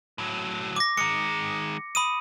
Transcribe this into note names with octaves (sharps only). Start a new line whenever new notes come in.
A2 F#3
D6 A#6
D#3 G#3 C#7
B5 D#6 D#7